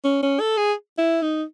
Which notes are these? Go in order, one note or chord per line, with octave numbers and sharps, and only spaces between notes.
C#4
C#4
A4
G#4
E4
D#4